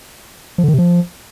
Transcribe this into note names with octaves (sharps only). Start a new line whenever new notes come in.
F3
D3
D#3
C3
F3